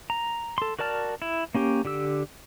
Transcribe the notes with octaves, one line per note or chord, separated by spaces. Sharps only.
A#5
A4 C6
F#4 A#4 D5 A5 F6
E4
A#3 C#4 G4
D3 G4 E6